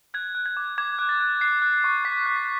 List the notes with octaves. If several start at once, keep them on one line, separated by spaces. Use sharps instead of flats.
F#6 G#6
F#6
G#6
D6
D6 G#6
F#6
A6
F#6
F#6 C7
F#6
C#6
C#6 B6
F#6
B6